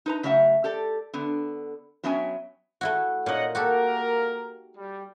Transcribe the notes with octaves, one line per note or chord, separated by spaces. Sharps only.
D#4 B4 A#5
C#3 F#3 A3 E5 F#5
G4 A4 D5
D3 B3
F#3 B3 C#4 E5 G5 G#5
A3 E4 F#4
A#2 D#4 C#5 D#5 F#5
A#3 F#4 G4 A4 A#4
G3